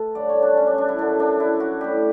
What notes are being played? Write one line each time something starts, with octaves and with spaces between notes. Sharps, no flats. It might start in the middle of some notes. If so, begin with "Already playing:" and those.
Already playing: A3 A4 B4
G2 D3 F#3 D5
C#5
D4
C#4
D4
D4
E4
F#2 D3 F#3 D4
D4
E4
F#4
A2 G3 G4